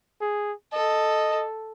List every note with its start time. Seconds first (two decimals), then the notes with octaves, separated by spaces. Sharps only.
0.21 G#4
0.73 A4 D#5